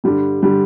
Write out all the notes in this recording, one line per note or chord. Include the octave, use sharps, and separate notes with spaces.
G2 D3 G3
D3 G3